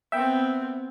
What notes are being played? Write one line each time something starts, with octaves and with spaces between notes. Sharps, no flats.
B3 C4 E5 G5